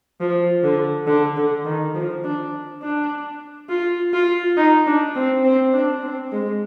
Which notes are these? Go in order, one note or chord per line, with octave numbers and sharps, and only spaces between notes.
F3
D3
D3
D3
D#3
F3
D4
D4
F4
F4
D#4
D4
C4
C4
D4
C4
G#3